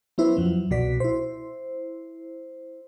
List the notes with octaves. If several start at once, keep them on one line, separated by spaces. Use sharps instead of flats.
F#3 B3 C#4 E4 B4 C5
F2 F3 F#3
C2 B2 F#4 D5 B6
E4 C5